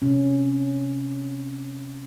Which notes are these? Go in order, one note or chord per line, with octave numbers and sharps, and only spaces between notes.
C3 C#4